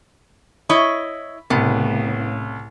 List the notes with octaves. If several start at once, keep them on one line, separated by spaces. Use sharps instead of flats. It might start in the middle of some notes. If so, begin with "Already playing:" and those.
E4 C#5 D#5 B5
C2 A2 C#3 B3